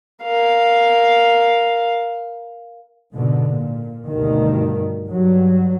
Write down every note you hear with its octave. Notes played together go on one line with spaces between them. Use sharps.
A#4 F5
G#2 B2 D3
A#2
D2 G2 B2 D#3
G2 F#3